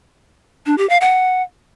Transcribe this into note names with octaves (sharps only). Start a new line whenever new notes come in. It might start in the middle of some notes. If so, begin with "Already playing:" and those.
D4
G4
F5
F#5